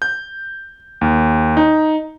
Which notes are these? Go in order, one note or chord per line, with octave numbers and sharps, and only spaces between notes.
G6
D#2
D#4